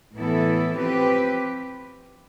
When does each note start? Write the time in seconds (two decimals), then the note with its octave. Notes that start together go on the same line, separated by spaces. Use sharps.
0.16 A2 E3 B3 E4 A4
0.75 F3 C4 G4 B4